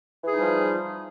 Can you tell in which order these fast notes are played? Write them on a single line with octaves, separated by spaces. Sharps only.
E3 G#4 D#4 G3 F3